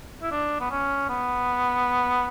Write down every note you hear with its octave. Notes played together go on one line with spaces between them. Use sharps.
E4
D4
B3
C#4
B3